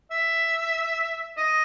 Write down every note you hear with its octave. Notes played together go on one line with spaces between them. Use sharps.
E5
D#5